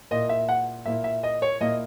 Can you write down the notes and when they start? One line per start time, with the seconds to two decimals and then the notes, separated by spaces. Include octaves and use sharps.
0.11 A#2 A#3 E4 D#5
0.29 E5
0.49 F#5
0.86 A#2 A#3 E4 E5
1.04 E5
1.23 D#5
1.42 C#5
1.60 A#2 A#3 E4 D#5